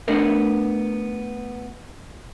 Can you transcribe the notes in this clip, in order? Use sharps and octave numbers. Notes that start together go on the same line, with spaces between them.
A3 B3 D4 D#4 A4 A#4